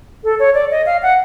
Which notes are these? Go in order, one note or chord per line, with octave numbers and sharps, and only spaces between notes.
A4
C#5
D5
D#5
F5
F#5